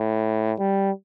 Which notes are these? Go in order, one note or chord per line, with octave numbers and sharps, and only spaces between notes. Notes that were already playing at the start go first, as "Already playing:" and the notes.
Already playing: A2
G3